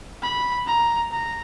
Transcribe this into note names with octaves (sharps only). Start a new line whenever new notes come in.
B5
A#5
A#5